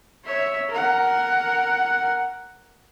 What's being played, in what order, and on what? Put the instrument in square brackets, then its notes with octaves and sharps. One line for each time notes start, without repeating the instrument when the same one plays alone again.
[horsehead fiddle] C#5 E5
A#4 F#5